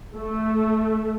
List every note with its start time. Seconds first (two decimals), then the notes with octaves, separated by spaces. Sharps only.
0.16 A3